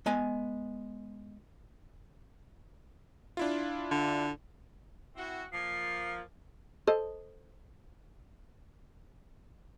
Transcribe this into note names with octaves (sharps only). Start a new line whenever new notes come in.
G#3 B3 G#5
D4 E4 F4
D3
C4 E4 F#4
F3 A#3 C7
A4 C5 D#5